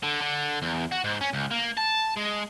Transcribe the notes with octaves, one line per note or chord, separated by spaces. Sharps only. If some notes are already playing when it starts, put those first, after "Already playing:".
D3
D3
E2
F#4
G#2
C#4
C#2
A#3
A5
G#3